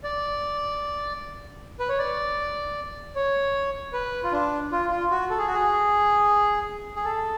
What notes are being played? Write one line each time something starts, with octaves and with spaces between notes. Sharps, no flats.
D5
B4
C#5
D5
C#5
B4
F4
D4
F4
F4
F#4
A4
G#4
F#4
G#4
G#4
A4